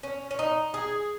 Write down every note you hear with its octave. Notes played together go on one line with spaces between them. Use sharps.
C#4
C#4
D#4
G#4